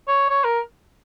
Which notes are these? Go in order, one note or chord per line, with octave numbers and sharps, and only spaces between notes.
C#5
C#5
A#4